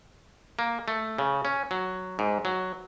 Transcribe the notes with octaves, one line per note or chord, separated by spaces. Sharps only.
A#3
A3
C#3
C#4
F#3
G#2
F#3